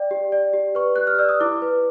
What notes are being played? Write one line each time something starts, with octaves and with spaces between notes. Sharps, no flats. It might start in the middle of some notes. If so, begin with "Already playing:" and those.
Already playing: D5 G5
G4
D5
G4
B4 C#6
G4 F#6
F6
D5 E6
D#6
E4 D6
B4